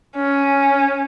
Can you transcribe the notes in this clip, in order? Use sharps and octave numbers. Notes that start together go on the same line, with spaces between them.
C#4